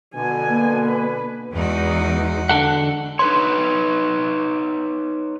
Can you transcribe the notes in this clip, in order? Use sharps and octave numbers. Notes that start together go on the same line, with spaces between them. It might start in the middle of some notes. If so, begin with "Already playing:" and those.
B2 D3 G#5
A#3
B4
E2 G#3 D#4 F#4
D3 A4 F#5
D#4 B4 C#5 C6